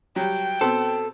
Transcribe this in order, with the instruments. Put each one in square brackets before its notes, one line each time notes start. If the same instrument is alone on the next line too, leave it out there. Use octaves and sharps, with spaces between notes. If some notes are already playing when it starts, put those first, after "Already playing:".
[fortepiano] F#3 G3 [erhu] G5
[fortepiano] B2 C4 [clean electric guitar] A4